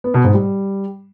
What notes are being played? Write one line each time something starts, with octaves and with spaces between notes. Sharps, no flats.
B3
B2
G#2
G3